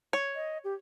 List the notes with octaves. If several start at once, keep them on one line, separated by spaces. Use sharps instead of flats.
C#5
D#5
G4